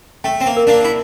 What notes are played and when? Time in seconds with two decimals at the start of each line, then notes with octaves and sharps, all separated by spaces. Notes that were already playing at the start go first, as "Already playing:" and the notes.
0.24 A3 G5
0.40 C4
0.46 A#3
0.57 A#4
0.67 A#3 D4
0.84 E4